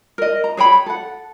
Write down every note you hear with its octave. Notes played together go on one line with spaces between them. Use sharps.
A#4 D#5
A#5
G#4 C#5 G5 B5
A4 F#5